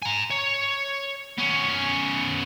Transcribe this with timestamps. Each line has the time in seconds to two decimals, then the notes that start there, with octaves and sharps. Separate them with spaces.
0.02 G#5 A#5
0.31 C#5
1.38 B3 C#4